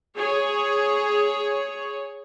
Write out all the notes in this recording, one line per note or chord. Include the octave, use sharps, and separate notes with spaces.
G#4 C#5